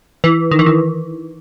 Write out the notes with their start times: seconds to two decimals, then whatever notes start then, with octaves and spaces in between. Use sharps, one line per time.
0.24 E3
0.51 D#3
0.59 E3
0.66 D#3